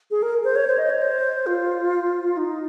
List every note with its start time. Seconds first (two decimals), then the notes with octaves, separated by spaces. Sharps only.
0.11 G#4
0.22 A#4
0.44 C5
0.55 C#5
0.67 C5
0.78 D#5
0.90 C#5
1.02 C5
1.46 F4
2.37 D#4